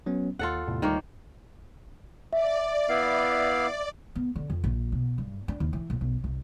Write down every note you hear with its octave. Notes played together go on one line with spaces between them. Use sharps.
F#3 B3 C#4
D#2 F4 A4 F#5
E2 A2 C3
D2 D#3 G3 A#3 C#5
D5 E5
B3 E4 F5
B3
D3
F2
A#1
B2
G2
D4
D#2
E3
A#1
B1
C2